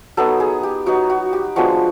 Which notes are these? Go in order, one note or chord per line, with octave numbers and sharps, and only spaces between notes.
F#3 B3 D#4 A4
G#4
G4
F#3 B3 D#4 F#4
F#4
G4
F3 G#3 B3 D4 F#4